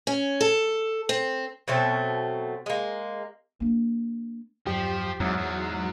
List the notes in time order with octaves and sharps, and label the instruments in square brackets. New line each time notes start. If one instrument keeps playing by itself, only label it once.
[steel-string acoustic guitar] C#4
A4
C4
[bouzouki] B2 F#3 A3 C4
G#3 A#3
[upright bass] A#3 D4
[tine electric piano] E2 G2 F#3 [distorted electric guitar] F3 [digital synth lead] G4
[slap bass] E2 [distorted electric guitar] G#2 [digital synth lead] F#3 [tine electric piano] C#5
[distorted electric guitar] G#2